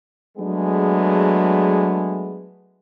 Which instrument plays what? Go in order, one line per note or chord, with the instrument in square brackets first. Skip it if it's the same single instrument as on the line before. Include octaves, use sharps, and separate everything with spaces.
[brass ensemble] F#3 G#3 A3 B3 D4 G#4